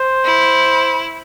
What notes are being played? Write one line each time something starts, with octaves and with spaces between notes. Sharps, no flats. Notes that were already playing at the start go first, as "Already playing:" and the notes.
Already playing: C5
E4